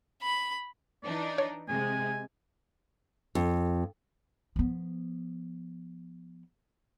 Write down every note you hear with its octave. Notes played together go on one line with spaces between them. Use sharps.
B5
E3 D4 D#4 D5
C#5
C3 G#3 G#5
F2
F3 B3